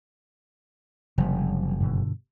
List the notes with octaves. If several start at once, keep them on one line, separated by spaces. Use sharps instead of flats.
F#1 C3 F3 G3
G2 B2 D3